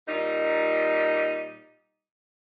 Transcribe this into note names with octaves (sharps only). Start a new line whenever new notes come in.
A#2 G3 D#4